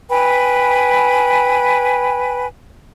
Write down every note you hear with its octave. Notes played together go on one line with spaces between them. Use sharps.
B4 G5 G#5 B5